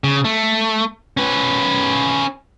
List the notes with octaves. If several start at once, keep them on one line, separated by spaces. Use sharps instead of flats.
C#3
A3
C#4 B4